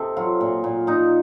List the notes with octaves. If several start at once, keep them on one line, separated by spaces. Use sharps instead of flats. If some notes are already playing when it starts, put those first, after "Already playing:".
Already playing: C3 A4 D#5
F#3 F4
A#2
A#2
A#2 D#4